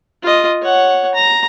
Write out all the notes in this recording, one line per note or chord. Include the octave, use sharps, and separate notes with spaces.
F4 D#5
C#5 F#5
A#5